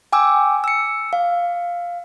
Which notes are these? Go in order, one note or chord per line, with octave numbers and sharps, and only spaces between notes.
G5 G#5 D6 E6
E6 C#7
F5